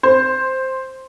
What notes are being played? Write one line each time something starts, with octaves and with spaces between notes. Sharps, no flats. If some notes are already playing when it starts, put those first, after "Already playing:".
C5